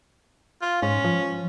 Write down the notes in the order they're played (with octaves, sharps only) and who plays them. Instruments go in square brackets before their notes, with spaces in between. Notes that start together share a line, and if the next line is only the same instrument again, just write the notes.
[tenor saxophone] F4
[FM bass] G#2 [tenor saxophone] C#4
[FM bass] F3